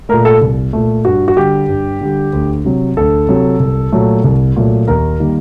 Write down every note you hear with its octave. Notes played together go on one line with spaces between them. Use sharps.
A#2 A3 A#4
A4
C2
A#2 A3
G2 F#4
F#4
D3 G3 G4
G2
D3 G3
D2
C3 F#3
D2 A4
C3 F#3
C2
A#2 F#3 A3
C2
A#2 F#3 A3
D#2 A#4
D#3 G3 A#3